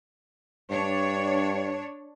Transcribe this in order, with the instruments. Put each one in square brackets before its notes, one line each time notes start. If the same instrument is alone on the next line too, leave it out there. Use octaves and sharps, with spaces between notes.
[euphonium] G2 [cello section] D4 C#5